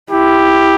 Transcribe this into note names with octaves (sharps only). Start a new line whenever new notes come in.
E4 G4